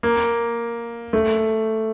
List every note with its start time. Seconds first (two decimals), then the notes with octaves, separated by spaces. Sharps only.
0.03 A#3
1.13 A3